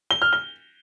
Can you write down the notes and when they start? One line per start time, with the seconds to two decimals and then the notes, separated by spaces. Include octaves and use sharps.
0.11 G7
0.22 F6
0.33 G7